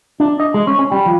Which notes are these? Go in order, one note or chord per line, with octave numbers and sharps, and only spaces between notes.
D4
D#5
G#3
C#4
C#4
G3
F3